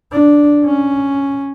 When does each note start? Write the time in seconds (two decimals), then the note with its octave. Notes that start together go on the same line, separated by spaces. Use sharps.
0.12 D4
0.65 C#4